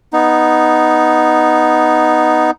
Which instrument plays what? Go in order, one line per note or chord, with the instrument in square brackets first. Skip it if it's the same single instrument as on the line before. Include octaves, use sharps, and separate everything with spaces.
[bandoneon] B3 D#4